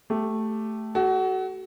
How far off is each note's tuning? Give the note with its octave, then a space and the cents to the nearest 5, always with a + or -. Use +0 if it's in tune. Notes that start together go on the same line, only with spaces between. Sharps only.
A3 +0 G4 +0
F#4 +25 A4 -35